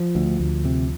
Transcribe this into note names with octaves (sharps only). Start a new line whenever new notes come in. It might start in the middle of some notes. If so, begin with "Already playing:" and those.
Already playing: F3
D2
D2
C3